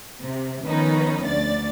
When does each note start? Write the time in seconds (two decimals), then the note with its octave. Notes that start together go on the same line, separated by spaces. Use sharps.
0.23 C3
0.66 D#3 F3 B3 C#4 D#4 B4
1.25 D2 D5 A6